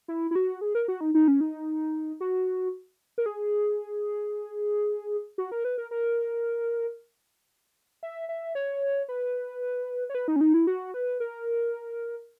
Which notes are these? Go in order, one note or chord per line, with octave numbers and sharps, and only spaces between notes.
E4
E4
F#4
G#4
A#4
F#4
D#4
D#4
C#4
D#4
F#4
A#4
G#4
F#4
A#4
B4
A#4
A#4
E5
E5
C#5
B4
C#5
B4
D#4
C#4
D#4
E4
F#4
B4
A#4